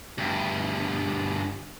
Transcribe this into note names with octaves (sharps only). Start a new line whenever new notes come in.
D2 G2